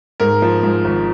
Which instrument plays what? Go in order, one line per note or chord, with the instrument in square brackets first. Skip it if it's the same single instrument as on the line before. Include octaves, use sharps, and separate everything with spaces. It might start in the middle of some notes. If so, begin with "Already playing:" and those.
[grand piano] G#2 A#4
F3
G#2
G#1